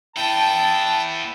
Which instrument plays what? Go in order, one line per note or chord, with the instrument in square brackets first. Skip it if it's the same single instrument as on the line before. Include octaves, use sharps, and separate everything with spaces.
[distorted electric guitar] B3 E4 [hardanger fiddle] G5 [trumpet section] A5